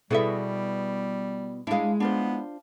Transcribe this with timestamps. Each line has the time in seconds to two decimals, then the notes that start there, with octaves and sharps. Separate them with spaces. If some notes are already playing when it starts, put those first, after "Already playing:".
0.11 B2 G3 B3 E4 G#4 A4 E5
1.67 G#3 D4 E4 F5
2.00 B3 D4 F4 C5